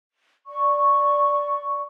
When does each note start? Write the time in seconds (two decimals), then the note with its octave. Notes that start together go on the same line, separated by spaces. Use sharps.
0.47 D5 C#6